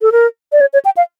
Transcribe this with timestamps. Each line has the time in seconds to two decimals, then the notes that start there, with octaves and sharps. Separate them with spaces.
0.02 A4
0.12 A#4
0.52 D5
0.61 C#5
0.73 C#5
0.85 G5
0.97 F5